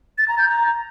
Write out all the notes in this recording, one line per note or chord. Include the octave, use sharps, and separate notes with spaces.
A6
A#5
G6
A#5